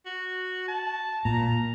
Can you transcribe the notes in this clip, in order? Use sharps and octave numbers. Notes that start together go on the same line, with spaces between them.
F#4
A5
A#2 A#5